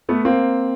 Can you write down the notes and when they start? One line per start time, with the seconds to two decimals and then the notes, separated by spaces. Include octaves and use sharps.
0.09 A3 B3
0.25 A#3 C4